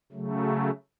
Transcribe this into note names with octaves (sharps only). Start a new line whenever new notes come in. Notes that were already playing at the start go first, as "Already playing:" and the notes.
C#3 F#3 A3